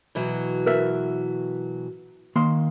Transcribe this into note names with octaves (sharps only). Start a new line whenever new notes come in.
B2 E3 F#3
A#4 B4 E5
D#3 A#3 C6